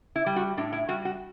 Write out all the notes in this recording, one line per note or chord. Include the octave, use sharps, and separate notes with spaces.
E4
G3
F#4
A2 D4
E4
G3 F#4
F#4